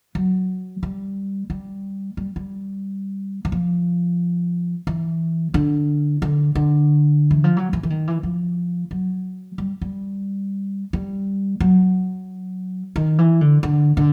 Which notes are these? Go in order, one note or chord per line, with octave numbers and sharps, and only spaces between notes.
F#3
G3
G3
G3
G3
E3
F3
E3
D3
D3
D3
E3
F3
F#3
E3
E3
D#3
E3
F3
F#3
G3
G3
G3
F#3
D#3
E3
D3
D3
D3